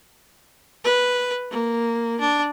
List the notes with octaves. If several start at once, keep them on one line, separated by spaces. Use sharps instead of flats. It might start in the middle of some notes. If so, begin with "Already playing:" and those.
B4
A#3
D4